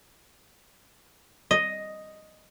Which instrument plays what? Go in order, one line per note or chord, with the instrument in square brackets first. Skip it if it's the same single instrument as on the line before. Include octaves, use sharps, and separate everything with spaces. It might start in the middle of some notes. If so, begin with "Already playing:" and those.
[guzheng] D#5